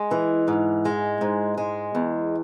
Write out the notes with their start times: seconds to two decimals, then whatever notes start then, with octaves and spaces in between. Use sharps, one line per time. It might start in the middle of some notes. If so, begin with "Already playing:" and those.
Already playing: G#3
0.11 E3
0.48 G#2
0.85 G#3
1.21 G#2
1.58 G#3
1.95 E2